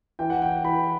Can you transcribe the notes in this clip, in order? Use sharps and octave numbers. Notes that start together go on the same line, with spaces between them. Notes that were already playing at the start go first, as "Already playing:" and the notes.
E3 G5
F#5
G5
E3 B5